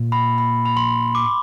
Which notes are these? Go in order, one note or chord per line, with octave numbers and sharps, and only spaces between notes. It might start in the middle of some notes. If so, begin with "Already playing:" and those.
Already playing: A#2
B5
B5
B5
C6
D6